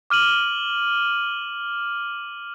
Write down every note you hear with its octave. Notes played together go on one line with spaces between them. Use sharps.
D6 F6 D#7 F#7